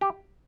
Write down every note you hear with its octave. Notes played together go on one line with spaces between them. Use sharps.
G4